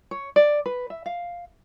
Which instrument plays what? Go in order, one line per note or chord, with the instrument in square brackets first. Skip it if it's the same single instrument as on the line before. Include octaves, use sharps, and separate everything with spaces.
[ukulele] C#5
D5
B4
E5
F5